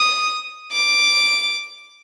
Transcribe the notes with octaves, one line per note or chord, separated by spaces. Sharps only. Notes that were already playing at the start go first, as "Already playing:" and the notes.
Already playing: D#6
D6